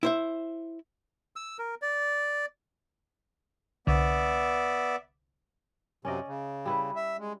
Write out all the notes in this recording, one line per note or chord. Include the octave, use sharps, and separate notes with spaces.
E4 C5 E5
E6
A#4
D5
C2 D3 B3 D5 E5
F#2 C3 C#4 D5 D#5
C#3
G3 E4 B4
E5
G#3